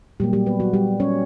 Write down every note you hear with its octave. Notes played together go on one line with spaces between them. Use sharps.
A#2 F#3 G3 A#3 G4
G3 G4
B3 B4
F#3 F#4
G3 G4
C#4 C#5